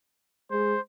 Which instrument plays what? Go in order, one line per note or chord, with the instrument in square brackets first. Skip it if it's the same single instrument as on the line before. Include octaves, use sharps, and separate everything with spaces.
[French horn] G#3 [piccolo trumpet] C5